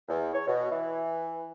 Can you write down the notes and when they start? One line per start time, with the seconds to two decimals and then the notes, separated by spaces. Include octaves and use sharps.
0.08 E2
0.34 C#5
0.47 B2
0.70 E3